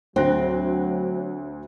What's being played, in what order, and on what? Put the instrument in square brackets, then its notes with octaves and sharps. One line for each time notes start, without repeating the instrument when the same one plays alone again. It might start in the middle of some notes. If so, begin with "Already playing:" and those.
[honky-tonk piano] D2 F#6 A#6 [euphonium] F#3 [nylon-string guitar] C4